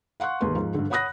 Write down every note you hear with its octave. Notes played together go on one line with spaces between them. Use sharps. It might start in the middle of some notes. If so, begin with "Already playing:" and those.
F5 F#5 C6 C#6 F#6
E1 D#2 G#2 B4 C6
G#2 F3
G2 D3
C#5 F#5 B5 D#6 F#6 A#6